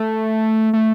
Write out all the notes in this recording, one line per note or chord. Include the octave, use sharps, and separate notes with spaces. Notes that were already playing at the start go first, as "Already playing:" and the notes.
Already playing: A3
A3